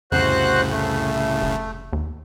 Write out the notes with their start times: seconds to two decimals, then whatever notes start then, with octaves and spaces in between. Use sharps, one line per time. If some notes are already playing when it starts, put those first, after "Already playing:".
0.12 C2 F2 A2 C#3 F#4 C5 F#6
0.70 A3
1.42 F1
1.93 D#2